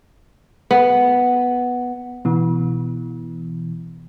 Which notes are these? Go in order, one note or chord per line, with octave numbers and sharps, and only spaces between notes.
B3
B2 E3